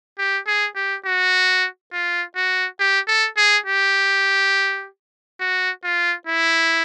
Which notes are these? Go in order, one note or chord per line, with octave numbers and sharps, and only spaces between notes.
G4
G#4
G4
F#4
F4
F#4
G4
A4
G#4
G4
F#4
F4
E4